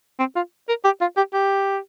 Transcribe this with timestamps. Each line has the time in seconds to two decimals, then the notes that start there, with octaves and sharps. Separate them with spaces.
0.19 C4
0.36 F4
0.68 A#4
0.84 G4
1.01 F4
1.17 G4
1.33 G4